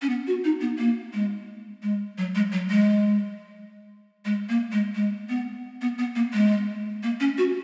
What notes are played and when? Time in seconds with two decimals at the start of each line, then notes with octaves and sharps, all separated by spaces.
0.02 C#4
0.09 B3
0.27 F#4
0.44 D#4
0.61 B3
0.78 A#3
1.14 G#3
1.83 G#3
2.18 F#3
2.35 G#3
2.52 F#3
2.70 G#3
4.25 G#3
4.49 A#3
4.72 G#3
4.95 G#3
5.29 B3
5.81 B3
5.99 B3
6.16 A#3
6.34 G#3
7.03 A#3
7.20 C#4
7.38 F#4